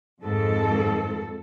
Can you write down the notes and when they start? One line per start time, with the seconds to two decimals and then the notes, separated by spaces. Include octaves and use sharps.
0.21 F2 G#2 D#3 A4